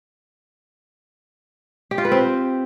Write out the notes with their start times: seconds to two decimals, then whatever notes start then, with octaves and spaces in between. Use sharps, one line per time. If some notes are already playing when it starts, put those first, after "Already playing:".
1.91 G4
1.98 F4
2.05 B4
2.12 C4